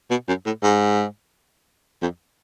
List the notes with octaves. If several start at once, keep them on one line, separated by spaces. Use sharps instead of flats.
B2
F#2
A2
G#2
F2